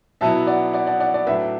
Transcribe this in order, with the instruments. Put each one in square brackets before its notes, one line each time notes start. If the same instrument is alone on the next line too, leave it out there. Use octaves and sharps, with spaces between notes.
[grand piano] B2 F#3 B3 E4 [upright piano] E5 A5
[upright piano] D5 F#5
D5 F#5
D5 F#5
D5 F#5
D5 F#5
[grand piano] A2 F#3 D4 [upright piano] B4 E5